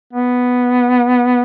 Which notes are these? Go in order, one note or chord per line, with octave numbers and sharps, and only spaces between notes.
B3